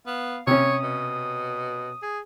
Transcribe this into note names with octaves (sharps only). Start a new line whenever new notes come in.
B3 F5
C3 C#4 C#5 D#6
B2
G#4